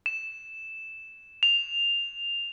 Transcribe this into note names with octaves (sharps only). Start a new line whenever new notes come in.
E7
F7